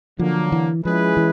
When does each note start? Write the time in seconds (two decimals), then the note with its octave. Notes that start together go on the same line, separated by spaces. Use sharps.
0.19 D3 F3 F#3 A#3
0.52 E3
0.84 F3 G#3 C#4 E4 G#4 B4
1.17 E3